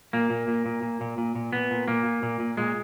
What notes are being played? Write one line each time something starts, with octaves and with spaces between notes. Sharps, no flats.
A#2 A#3
A#2
A#2
A#2
A#2
A#2
A#2
A#2
A#2 B3
A#2
A#2 A#3
A#2
A#2
A#2
A#2 G#3